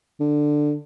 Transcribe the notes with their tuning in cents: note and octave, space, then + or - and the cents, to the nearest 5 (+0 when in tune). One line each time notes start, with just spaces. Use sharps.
D3 +10